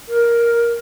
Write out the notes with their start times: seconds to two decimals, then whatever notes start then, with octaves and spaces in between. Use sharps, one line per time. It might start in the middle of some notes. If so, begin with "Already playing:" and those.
0.08 A#4